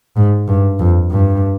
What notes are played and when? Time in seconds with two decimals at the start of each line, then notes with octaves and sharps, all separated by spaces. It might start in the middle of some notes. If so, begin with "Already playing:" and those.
0.17 G#2
0.48 G2
0.80 F2
1.11 G2